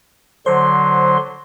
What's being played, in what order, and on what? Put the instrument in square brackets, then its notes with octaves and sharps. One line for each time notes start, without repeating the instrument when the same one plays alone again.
[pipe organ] D3 F#3 C6 [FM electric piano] C5